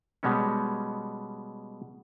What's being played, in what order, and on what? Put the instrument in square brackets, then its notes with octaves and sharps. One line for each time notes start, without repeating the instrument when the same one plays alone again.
[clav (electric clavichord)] B2 G3 G#3 B3 C#4